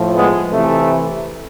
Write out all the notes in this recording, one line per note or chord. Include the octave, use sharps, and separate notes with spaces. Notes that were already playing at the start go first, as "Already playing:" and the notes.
Already playing: A2 F3
G#3 B3
C3 E3 A3